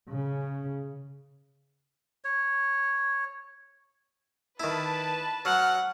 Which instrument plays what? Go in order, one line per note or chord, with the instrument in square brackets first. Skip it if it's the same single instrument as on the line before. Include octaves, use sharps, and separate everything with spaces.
[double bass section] C#3
[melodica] C#5
[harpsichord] D#3 E4 [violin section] B4 A5
[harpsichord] F#3 [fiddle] F#5 [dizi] F6